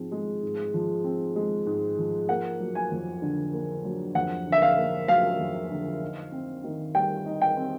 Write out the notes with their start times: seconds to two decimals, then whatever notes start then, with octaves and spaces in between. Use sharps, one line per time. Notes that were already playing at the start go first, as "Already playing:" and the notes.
Already playing: G#2 F3 G#3 C4
0.12 G#3
0.42 G#2
0.74 F3
1.04 C4
1.36 G#3
1.67 G#2
1.98 F3
2.29 A#3 F#5
2.60 F#3
2.75 G#5
2.92 F2
3.22 D3
3.53 A#3
3.85 F#3
4.15 F2 F#5
4.46 D3
4.52 E5
4.62 F5
4.78 A#3
5.08 F#3 F5
5.39 F2
5.71 D3
6.01 D#4
6.32 C4
6.64 D#3
6.95 G3 G5
7.26 D#4
7.42 G5
7.57 C4